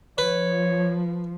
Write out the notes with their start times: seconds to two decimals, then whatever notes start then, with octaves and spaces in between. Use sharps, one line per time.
0.18 F3 B4 C#5